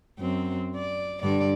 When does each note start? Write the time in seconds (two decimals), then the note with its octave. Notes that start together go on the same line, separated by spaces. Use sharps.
0.19 F#2 C4
0.76 D5
1.22 G2 D3 D5